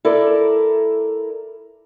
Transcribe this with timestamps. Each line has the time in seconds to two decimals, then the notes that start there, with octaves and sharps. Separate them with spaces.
0.05 E4 A4 A#4 D5